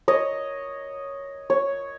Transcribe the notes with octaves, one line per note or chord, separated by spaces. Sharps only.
C#5 D#5
C#5